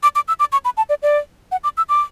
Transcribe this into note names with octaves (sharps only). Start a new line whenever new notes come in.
D6
D6
E6
D6
C#6
B5
A5
D5
D5
F#5
D6
E6
D6